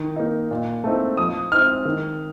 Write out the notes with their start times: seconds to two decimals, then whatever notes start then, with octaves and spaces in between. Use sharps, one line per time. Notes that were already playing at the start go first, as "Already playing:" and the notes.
Already playing: D#3
0.16 A#3 D#4
0.51 A#2
0.84 A3 C4 D#4
1.17 F3 D#6
1.52 C4 D#4 F6
1.85 D#3